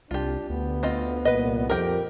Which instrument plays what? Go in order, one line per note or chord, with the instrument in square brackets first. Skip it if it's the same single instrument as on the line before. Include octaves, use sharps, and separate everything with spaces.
[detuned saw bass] C2 [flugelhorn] D4 [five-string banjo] F4 G4
[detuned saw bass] D2 [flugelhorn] B3
[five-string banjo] C4 F4 D#5
[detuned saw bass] C2 [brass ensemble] A#2 [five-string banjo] B4 D#5
[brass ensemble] F2 [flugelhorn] G4 [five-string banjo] A#4 G5